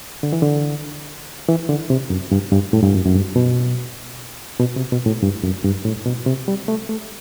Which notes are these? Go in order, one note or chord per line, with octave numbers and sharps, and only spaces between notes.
D3
E3
D3
E3
D3
C3
F#2
G2
G2
A2
G2
F#2
F#2
G2
B2
B2
C3
B2
A2
G2
F#2
G2
A2
B2
C3
G3
A3
A3